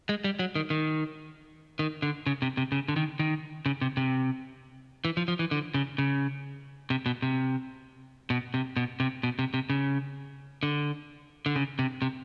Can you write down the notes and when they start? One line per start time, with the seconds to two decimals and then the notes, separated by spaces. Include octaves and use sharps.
0.09 G#3
0.24 G3
0.39 F#3
0.55 D#3
0.70 D#3
1.79 D#3
2.02 D3
2.26 C#3
2.42 C3
2.57 C3
2.72 C#3
2.88 D3
2.96 D#3
3.19 D#3
3.66 C#3
3.81 C3
3.97 C3
5.05 E3
5.17 F3
5.28 F3
5.39 E3
5.51 D3
5.74 C#3
5.98 C#3
6.90 C3
7.06 B2
7.22 C3
8.30 B2
8.54 C3
8.76 B2
9.00 C3
9.23 B2
9.39 C3
9.54 C3
9.70 C#3
10.63 D3
11.46 D3
11.56 C#3
11.79 C3
12.02 C3